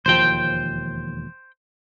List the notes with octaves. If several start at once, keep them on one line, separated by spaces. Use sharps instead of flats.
E1 D#2 F3 C5 G5